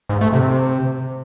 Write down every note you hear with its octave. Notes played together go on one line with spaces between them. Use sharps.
G#2
A3
C3